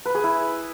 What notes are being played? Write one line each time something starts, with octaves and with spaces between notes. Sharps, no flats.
B4
G#4
E4